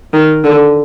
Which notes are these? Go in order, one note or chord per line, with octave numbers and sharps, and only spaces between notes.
D#3
D3